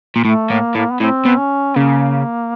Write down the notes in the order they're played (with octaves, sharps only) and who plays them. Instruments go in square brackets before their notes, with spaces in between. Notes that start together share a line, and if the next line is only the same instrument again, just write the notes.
[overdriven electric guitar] A#2
[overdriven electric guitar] A2 [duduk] A3
[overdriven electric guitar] A2 [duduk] A#3
[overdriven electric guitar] A2 [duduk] A#3
[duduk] B3
[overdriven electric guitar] A2 [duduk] C4
[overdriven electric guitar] B2
[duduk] C#4
[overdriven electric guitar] C#3 [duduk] A#3